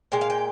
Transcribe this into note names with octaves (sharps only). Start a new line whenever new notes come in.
A#2 G#3 G5
F5
G5